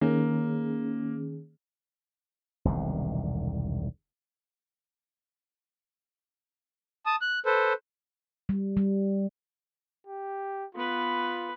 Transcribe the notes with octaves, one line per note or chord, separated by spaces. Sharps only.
D#3 A#3 C#4 G#4
E1 C2 D3 D#3
A5 D#6
F#6
A4 B4 C5
G3
G3
G4
B3 F4 B4